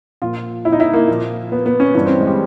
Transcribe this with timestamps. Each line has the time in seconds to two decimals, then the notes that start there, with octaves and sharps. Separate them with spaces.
0.22 A#2 F3 F4
0.65 E4
0.72 D#4
0.80 E4
0.94 A#3
1.08 A#2 F3
1.52 B3
1.66 B3
1.80 C#4
1.94 G2 E3 C#4
2.06 C4
2.21 G#3
2.27 G3